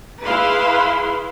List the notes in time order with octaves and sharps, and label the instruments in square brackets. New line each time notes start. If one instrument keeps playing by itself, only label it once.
[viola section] E4 G#4 B4 F5 C6